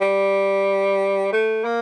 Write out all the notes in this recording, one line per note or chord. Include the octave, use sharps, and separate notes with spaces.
G3
A3
A#3